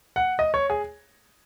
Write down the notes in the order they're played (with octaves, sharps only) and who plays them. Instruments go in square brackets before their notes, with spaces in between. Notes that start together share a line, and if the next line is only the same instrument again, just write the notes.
[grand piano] F#5
D#5
C#5
G#4